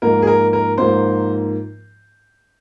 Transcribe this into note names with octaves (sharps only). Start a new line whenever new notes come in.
G#2 F3 A#3 A#4
G#4
A#4
A#4
G#2 F3 A#3 C5